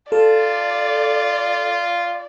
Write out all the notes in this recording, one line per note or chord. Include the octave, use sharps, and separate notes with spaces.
F4 A4 D5